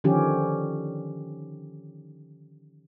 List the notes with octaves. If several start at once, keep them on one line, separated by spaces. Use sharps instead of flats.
D3 D#3 F3 C#4 G4